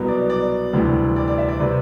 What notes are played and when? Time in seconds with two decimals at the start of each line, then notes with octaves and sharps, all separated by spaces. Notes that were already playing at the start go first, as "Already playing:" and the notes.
Already playing: C2 B2 F#3 B3
0.08 D5
0.30 D5
0.73 D2 C3 E3 G3
1.16 D5
1.28 D5
1.38 E5
1.49 D5
1.60 C3 G3 C4 B4